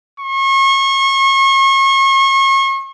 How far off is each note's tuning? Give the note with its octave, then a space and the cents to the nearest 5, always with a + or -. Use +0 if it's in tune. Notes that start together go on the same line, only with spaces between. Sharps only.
C#6 -35